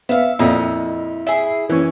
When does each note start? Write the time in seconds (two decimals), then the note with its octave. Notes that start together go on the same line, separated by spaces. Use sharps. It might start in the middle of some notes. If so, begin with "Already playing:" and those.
0.09 B3 E5 F5
0.39 F2 A#2 E4 D#5
1.27 E4 G#4
1.69 E3 C#4